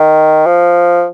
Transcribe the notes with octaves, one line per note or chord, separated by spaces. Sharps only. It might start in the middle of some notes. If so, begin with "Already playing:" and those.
Already playing: D#3
F3